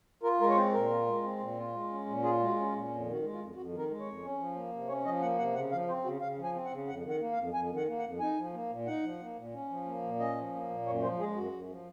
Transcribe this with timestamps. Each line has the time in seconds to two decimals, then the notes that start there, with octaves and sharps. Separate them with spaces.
0.23 F4 A#4
0.40 G#3 A#4
0.49 C#5
0.56 C4 C5
0.74 A#2 A#4
0.90 F4
1.06 G#3
1.23 C4
1.39 A#2
1.57 F4
1.73 G#3
1.90 C#4
2.06 A#2
2.23 F4 G#4
2.40 G#3
2.45 F#4
2.56 C#4
2.67 F4
2.72 A#2
2.89 F2
3.05 D#3
3.11 F#4
3.22 G#3
3.33 F4
3.39 F2
3.55 F2 F#4
3.72 D#3
3.78 A#4
3.89 G#3
4.00 C#5
4.05 F2
4.22 C#4
4.38 F3
4.55 A#3
4.72 C3
4.88 C#4 C#5
5.05 F3 D#5
5.22 A#3 F#5
5.38 C3 F#5
5.55 C#3 F#5
5.71 F3 F5
5.88 C4 C5
6.04 C#3 F#4
6.21 C#3 F5
6.38 F3
6.44 G#5
6.55 C4
6.65 F#5
6.71 C#3
6.88 F2 F#5
7.04 D#3
7.10 F#5
7.21 A#3
7.32 F5
7.37 F2
7.54 F2 G#5
7.71 D#3
7.77 F#5
7.88 A#3
7.98 F#5
8.03 F2
8.20 D#4 G#5
8.38 F3
8.53 A#3
8.70 A#2
8.87 D#4 F#5
9.03 F3
9.19 A#3
9.36 A#2
9.54 C#4
9.70 F3
9.86 A#3
10.03 A#2
10.19 C#4 D#5
10.36 F3
10.52 A#3
10.69 A#2
10.86 F#2 C#5
11.02 F3 C5
11.19 G#3 G#4
11.36 F#2 F#4
11.52 F#2
11.69 F3